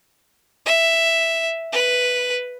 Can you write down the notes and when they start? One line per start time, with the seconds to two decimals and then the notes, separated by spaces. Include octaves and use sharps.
0.66 E5
1.73 B4